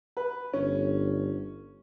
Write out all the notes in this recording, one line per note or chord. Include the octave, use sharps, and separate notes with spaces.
B4
G1 C#4